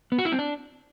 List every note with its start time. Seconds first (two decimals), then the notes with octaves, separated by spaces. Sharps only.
0.12 B3
0.19 F#4
0.25 E4
0.32 C4
0.39 D4